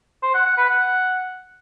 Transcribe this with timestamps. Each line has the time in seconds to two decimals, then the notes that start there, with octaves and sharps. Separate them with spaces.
0.22 C5
0.34 F#5
0.46 F#5
0.58 B4
0.69 F#5